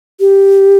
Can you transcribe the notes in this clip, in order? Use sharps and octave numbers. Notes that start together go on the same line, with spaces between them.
G4